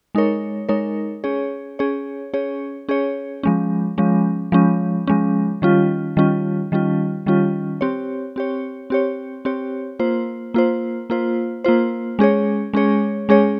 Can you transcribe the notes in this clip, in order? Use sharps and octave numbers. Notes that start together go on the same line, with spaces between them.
G#3 D#4 A#4 C#5
G#3 D#4 A#4 C#5
C#4 G#4 C#5
C#4 G#4 C#5
C#4 G#4 C#5
C#4 G#4 C#5
F3 G#3 C#4
F3 G#3 C#4
F3 G#3 C#4
F3 G#3 C#4
D#3 G3 C#4 F4
D#3 G3 C#4 F4
D#3 G3 C#4 F4
D#3 G3 C#4 F4
C4 G4 C#5
C4 G4 C#5
C4 G4 C#5
C4 G4 C#5
A#3 F4 C5
A#3 F4 C5
A#3 F4 C5
A#3 F4 C5
G#3 C#4 G#4 C#5
G#3 C#4 G#4 C#5
G#3 C#4 G#4 C#5